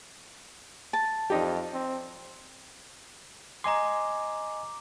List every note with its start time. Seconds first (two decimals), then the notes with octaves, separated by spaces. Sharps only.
0.93 A5
1.30 F2 D4 D#4 G4
1.73 C4
3.64 D#5 G#5 A#5 C6 D6